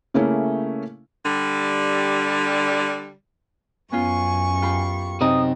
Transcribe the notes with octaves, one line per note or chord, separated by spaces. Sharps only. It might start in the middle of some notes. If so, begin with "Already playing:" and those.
C#3 A3 A#3 C#4 E4
D3 G3
F#2 B3 C#4 F4 G#5 C#6
F4 G4 B5
F#2 C3 C4 D#4 D#5 D#6